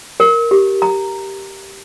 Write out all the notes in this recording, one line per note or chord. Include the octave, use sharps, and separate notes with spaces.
A#4
G4
A#5